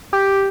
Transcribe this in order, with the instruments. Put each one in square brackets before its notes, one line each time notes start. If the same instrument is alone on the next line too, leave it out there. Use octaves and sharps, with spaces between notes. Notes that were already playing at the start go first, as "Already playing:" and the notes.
[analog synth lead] G4